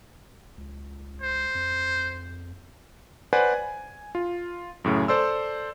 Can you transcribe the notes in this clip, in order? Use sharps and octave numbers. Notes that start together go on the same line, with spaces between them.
C#2
C5
F2
B4 C5 D5 F#5 G#5
G#5
F4
F#2 A2 C#3
A4 C5 D5 C6 E6